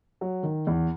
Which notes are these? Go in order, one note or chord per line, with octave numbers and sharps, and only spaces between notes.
F#3
D#3
E2